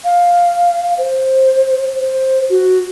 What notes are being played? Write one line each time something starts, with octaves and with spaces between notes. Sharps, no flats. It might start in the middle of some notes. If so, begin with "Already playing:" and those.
F5
C5
C5
F#4